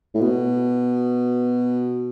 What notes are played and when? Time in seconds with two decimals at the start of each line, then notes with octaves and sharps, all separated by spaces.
0.15 A2
0.21 B2